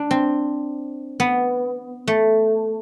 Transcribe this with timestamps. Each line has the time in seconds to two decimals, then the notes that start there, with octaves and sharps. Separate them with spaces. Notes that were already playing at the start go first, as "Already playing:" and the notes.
Already playing: D4
0.11 C4
1.20 B3
2.07 A3